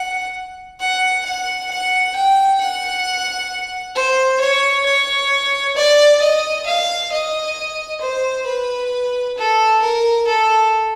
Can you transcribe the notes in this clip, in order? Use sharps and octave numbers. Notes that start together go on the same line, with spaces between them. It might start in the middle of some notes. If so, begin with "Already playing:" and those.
Already playing: F#5
F#5
F#5
F#5
G5
F#5
C5
C#5
C#5
D5
D#5
F5
D#5
C5
B4
A4
A#4
A4